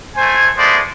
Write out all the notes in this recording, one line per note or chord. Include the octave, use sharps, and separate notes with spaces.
A3 C5 G#5
G#3 A3 B3 C5 D5